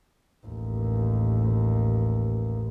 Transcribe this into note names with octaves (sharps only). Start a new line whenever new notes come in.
A1 D#2